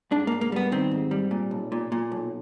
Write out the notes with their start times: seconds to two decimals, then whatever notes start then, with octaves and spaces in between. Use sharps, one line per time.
0.11 G#2 D4
0.27 G#2 A#3
0.41 A#3
0.52 G3 B3
0.72 D#3 C4
0.91 G#2
1.11 G3
1.31 A#2
1.51 B1
1.72 A#2
1.92 A#2
2.12 B1